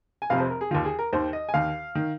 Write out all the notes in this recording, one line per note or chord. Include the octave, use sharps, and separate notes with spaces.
G#5
F1 F2 C3 F3 F5
C5
A#4
G#4
D#2 D#3 F4
G#4
A#4
D#2 D#3 C5
D#5
G#5
D#2 D#3 F5
D#3